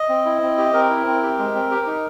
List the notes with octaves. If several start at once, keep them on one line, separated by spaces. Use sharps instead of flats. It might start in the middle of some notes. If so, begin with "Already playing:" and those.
Already playing: D#5
C4
E4
C4
G4
C4 A#4
E4
C4
G4
G#3
C4
G4
D#4